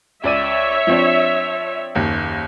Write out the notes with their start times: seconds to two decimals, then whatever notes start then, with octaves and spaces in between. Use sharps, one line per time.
0.24 C#2 C#5 D5 E5 D#7
0.87 F3 C4 D4
1.95 F#1 D#2